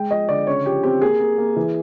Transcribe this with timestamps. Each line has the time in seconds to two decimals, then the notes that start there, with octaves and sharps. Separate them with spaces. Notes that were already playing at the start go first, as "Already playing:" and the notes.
Already playing: G#3 G5
0.11 F3 D#5
0.29 D3 D5
0.47 C#3 C#5
0.65 F3 G4
0.83 C4 G4
1.02 A#3 G#4
1.20 A#3
1.38 A#3
1.56 E3